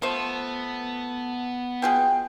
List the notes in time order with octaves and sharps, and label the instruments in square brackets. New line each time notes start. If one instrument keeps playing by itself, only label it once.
[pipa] F3 A3 C5 [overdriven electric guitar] B3
[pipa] B2 F4 G#4 [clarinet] G5